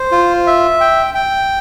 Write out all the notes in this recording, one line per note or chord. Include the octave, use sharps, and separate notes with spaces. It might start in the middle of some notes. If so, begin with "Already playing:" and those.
Already playing: C5
F4
E5
G5
G5